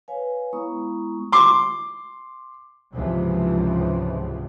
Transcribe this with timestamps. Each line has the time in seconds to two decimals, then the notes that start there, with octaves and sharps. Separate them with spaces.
0.08 B4 C#5 F5 G#5
0.53 G#3 B3 E4 A#5 C#6 D#6
1.32 C6 D6
2.93 C#2 G#2 C3 E3 F3